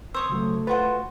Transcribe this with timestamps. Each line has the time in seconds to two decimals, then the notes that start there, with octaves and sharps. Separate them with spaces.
0.14 C5 C#5 D#6 E6
0.30 C#3 F#3 A3
0.67 F4 F#4 B4 C5 F#5